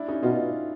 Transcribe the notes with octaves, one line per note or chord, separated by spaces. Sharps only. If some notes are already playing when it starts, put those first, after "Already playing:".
Already playing: D4 E4
C#4 D#4
B2 D#4 F4